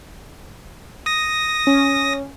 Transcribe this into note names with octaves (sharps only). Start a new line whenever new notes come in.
D#6 A#6
C#4